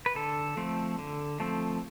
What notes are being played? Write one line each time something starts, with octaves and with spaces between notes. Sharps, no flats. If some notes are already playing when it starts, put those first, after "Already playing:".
B4
D3 A4
F3 A3 C4
D3
F3 A3 C4